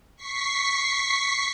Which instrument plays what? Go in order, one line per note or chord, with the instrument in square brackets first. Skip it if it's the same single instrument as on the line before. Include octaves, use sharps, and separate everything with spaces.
[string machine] C#6 B6 C7